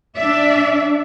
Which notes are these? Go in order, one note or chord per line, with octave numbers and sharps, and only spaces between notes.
D4 D5 E5